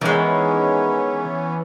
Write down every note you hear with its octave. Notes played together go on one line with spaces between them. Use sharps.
D#3 E3 G#3 B3 C#4